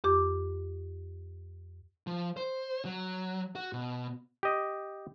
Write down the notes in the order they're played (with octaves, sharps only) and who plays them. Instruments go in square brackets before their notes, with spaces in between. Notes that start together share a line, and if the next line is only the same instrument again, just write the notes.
[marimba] F2 G4 D6
[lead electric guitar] F3
C5
F#3
F#4
B2
[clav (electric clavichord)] G4 D#5